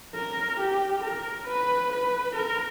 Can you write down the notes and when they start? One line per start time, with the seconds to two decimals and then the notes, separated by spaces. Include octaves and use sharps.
0.15 A#4
0.60 G4
1.03 A#4
1.47 B4
1.92 B4
2.35 A#4